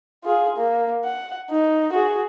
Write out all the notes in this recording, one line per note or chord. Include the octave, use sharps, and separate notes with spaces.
F4 G#4
A#3
F#5
D#4
F#4 G#4